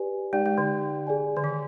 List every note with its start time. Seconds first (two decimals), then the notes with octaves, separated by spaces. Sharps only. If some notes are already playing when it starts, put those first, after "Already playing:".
Already playing: G4 B4 D5 G#5
0.33 G#3 D#4 G4 D5 G5
0.46 G#3
0.58 D3
1.07 G#4 D5 G#5
1.37 D3
1.44 D#3